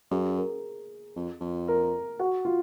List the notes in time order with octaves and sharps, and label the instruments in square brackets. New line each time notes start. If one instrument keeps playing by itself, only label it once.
[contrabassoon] F#2 [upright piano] G#4
[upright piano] A#4
[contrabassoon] F2
F2
[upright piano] A#4
F#4
F4